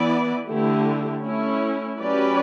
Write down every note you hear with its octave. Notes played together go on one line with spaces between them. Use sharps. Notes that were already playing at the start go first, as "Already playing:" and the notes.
Already playing: E3 B3 E4 B4 D5
D3 A3 E4 G4
A3 C#4 E4
F#3 C#4 G4 B4 D5